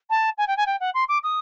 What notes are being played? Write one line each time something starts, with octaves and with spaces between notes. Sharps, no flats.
A5
G#5
G5
G#5
G5
F#5
C6
D6
D#6